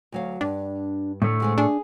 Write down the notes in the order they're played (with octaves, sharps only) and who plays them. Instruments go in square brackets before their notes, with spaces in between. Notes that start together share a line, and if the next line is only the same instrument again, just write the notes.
[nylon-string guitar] D2 F#3 F5
[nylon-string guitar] G2 [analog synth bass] D4
[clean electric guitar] A2 A3 [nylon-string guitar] D3
[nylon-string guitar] D3 G#3 C4
[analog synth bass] D4 [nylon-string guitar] G#4